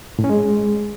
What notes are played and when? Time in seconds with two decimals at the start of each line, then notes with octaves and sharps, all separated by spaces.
0.19 A2
0.24 C#4
0.29 G#3